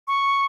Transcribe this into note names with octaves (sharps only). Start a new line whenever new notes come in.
C#6